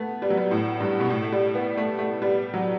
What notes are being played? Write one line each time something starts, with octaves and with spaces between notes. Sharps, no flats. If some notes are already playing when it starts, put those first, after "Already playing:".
Already playing: A3 B3
G3
F#3
G3
A2
G2
B2
A2
A3
G3
B3
A3
A3
G3
F#3